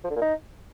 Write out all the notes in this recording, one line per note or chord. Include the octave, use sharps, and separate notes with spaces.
F3
D3
A#2
D#4